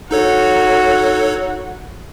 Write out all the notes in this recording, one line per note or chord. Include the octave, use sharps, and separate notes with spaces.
D#4 F#4 A4 C#5